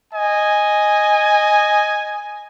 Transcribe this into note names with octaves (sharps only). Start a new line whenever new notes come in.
D#5 G#5